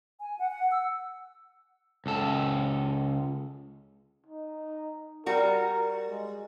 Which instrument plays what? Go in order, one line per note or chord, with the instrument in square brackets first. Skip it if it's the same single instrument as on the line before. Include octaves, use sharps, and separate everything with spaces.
[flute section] G#5
F#5
F#5
E6
[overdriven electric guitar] C#2 A4
[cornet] D#4
[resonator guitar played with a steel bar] G3 F#4 [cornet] A#4
[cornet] G#3